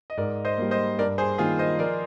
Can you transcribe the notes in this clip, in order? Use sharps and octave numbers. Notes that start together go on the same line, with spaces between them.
D#5
G#2 A#4 D5
C5 D#5
G3 A#3
C5 D#5
G2 A#4 D5
G#4 C5
D#3 A#3 F4 G#4
C5 D#5
F3 A#4 D5